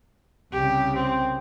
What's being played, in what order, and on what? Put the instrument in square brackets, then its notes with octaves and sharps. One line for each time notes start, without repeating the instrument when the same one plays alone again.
[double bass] C2 C#3 [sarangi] G4
[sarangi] C4